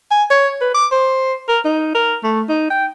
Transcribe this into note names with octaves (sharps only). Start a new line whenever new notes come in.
G#5
C#5
B4
D6
C5
A#4
D#4
A#4
A3
D#4
G5